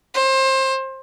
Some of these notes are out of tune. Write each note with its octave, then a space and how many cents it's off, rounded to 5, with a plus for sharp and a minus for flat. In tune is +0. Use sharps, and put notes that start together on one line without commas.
C5 +25